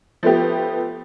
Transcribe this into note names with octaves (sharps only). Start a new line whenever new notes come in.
F3 A3 B3 G4